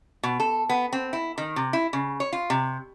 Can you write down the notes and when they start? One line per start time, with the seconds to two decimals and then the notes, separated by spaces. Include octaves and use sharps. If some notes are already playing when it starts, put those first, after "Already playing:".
0.23 B2
0.40 A4
0.69 B3
0.93 C4
1.13 E4
1.38 D#3
1.56 C3
1.73 E4
1.93 C#3
2.20 C#5
2.33 F4
2.50 C3